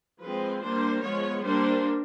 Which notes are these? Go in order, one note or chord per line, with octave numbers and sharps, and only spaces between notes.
F3 G#3 C4 B4
G3 A#3 D4 C5
F3 G#3 B3 C#5
G3 A#3 D4 C5